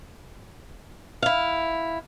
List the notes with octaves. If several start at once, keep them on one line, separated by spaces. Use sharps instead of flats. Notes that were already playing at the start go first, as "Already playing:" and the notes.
E4 F5